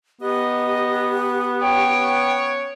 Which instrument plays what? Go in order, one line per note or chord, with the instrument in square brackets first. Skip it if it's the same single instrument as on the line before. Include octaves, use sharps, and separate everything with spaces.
[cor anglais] B3 [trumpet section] D#4 D#5 [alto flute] G4
[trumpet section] C#4 C#5 [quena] G5